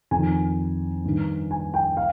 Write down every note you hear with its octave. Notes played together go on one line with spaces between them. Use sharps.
F2 D#3 G#5
G2 D#3
G#5
G5
F5